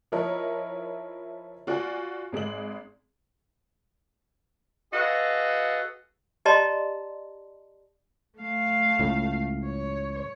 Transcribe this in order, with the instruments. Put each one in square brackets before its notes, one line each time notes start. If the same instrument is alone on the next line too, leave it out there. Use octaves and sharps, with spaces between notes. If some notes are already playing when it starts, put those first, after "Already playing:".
[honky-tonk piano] F3 E4 A#4 C#5 D#5
F4 F#4 D5 G#5
G#1 G#3 G#4 F#7
[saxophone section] F#4 G#4 A4 B4 D#5 F5
[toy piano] G4 D5 D#5 A5 A#5 C6
[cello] A3 F5
[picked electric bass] C#2 A2
[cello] C#5